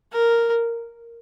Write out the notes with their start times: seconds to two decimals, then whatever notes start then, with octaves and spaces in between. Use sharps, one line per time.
0.12 A#4